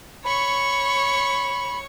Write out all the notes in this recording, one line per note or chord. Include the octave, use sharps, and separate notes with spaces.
C#5 B5 C#6